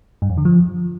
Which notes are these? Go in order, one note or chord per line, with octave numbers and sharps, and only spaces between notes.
G2
F2
D3
F3